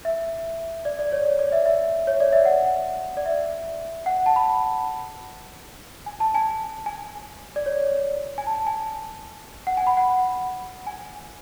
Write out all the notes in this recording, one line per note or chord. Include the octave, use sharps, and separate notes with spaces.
E5
D5
D5
C#5
D5
D5
E5
E5
C#5
D5
E5
F#5
D5
E5
F#5
A5
B5
G#5
A5
G#5
G#5
D5
C#5
G#5
A5
G#5
F#5
G#5
B5
F#5
G#5